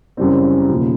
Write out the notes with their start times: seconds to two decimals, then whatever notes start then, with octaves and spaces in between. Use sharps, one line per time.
0.17 F#2 C#3 E3 G3 C4
0.69 E1 D#2 C#3 F3